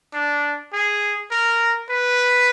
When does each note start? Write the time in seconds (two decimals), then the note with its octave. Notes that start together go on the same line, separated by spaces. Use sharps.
0.14 D4
0.73 G#4
1.31 A#4
1.90 B4